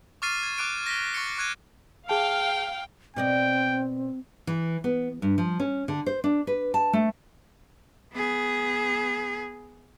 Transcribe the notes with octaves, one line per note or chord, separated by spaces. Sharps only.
C#6 D6 F6 A6 C7 D#7
G#6 A6
C#6 D6 F#6 D7 D#7
A#6 B6 G7
C#6 A6 A#6 C#7 G7
C#6 F#6 G#6 D#7
G#4 F5 G5 A5
B2 C4 D5 D#5 G5
E3
B3
G2
F3
C#4
D3
C5
D4
B4
A5
A3
B3 G#4